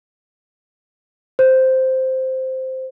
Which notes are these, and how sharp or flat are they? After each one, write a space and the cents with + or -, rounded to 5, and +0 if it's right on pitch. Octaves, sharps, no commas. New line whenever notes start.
C5 -5